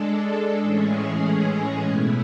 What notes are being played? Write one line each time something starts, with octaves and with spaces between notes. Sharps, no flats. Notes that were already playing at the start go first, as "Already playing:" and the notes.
Already playing: G#3 D4 A4
A2 E3 G#3 C#4 G#4
B2 A3 E4